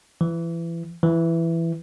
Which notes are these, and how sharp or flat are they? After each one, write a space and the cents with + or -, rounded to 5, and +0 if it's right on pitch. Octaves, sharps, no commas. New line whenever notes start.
E3 +25
E3 +10